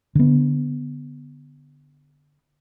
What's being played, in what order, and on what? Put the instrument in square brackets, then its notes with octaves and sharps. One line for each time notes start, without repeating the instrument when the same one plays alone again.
[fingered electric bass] D3 B3